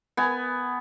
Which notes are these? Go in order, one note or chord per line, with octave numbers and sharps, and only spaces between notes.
B3 G#5